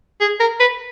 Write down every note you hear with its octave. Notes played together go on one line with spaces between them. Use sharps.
G#4
A#4
B4